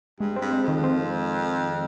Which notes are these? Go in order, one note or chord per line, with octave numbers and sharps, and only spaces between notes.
G2 G#3
C4
G2
G#3
F2 D#3
C4